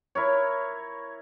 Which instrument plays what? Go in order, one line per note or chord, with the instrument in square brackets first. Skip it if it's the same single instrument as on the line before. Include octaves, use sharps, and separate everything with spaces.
[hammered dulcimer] E4 A#4 C#5